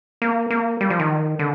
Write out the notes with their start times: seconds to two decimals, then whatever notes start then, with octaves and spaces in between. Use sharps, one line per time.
0.22 A#3
0.50 A#3
0.81 G3
0.90 F3
1.00 D#3
1.39 D3